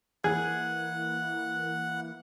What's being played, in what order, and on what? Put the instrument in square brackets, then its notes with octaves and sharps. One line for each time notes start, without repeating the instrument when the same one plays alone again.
[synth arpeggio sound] E3 A#3 E4 [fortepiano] G#4 [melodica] F#5